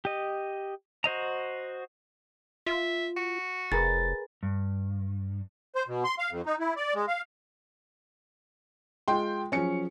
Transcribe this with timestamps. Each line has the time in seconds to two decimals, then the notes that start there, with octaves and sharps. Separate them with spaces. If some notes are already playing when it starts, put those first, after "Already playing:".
0.05 G4 D#5
1.04 F#4 C5 D#5 A#5
2.66 F4 E5
3.16 F#4
3.72 F1 G#4 A#4 B4 A6
4.43 G2
5.75 C5
5.88 B2
6.04 C6
6.19 F5
6.31 F2
6.46 D#4
6.60 E4
6.76 D5
6.95 G#3
7.08 F5
9.08 G#3 F4 G5 C6
9.52 F3 F#3 C#4 G#4 C#7